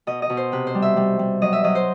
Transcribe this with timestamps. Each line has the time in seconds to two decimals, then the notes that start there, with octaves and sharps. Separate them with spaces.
0.07 B2 D#5
0.22 D#5
0.30 B2
0.37 C5
0.52 C3 B4
0.67 C5
0.75 G3
0.82 E5
0.97 G3
1.19 G3
1.42 F#3 D#5
1.53 E5
1.64 F#3 D#5
1.75 C5